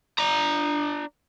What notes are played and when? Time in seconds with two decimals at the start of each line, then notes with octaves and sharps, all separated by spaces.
0.19 D4 A#5